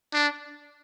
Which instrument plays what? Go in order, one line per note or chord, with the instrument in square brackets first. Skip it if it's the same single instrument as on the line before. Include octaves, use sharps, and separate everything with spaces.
[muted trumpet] D4